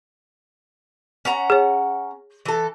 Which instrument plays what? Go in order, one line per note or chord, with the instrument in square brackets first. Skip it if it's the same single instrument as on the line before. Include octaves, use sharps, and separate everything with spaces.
[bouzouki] C#4 F#5 A#5
[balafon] G#4 C#5
[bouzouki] E3 A4